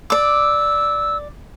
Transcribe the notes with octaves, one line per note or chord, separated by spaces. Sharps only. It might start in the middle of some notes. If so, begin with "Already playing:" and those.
D5 D6 E6